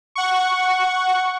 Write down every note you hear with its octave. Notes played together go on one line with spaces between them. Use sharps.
F#5 C#6